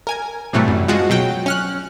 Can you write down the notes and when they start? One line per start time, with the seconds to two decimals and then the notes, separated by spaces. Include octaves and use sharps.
0.07 A#4 G#5 G#6
0.53 A2 C3 E3 F#3 G3 A3
0.68 F#2
0.88 F3 G#3 F#4
1.10 B2 F#3 G5
1.46 C#4 F6 F#6